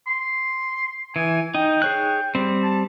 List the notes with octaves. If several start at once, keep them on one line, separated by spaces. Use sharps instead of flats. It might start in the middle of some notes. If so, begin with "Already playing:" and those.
C6
E3 G#5
D#4 G5
G#4 C#5 F#6
G3 C4
A5